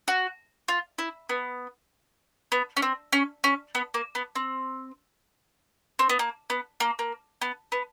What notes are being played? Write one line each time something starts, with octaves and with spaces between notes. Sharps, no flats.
F#4
F4
E4
B3
B3
C#4
C4
C#4
C#4
B3
A#3
B3
C4
C4
B3
A#3
B3
A#3
A#3
B3
B3